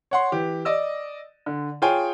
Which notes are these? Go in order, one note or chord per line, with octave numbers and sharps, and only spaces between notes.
C#5 F#5 C6
E3 G4
D5 D#5 E6
D3
F4 G#4 C#5 G5 G#5